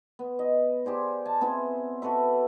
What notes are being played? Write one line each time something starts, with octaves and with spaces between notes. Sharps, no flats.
B3
D#5
G4 G#4 C5 D5
G#5 A5
B3 C4 E4 G#4
F#4 A4 B4 E5